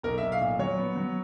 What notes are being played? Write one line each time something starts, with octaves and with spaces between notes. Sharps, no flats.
B1 A#4
E5
B1
F5
A#2
F#3 C#5
B3
F#3